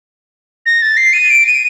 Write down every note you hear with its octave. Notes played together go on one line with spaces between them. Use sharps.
A#6
A6
C7
D#7
D7
D#7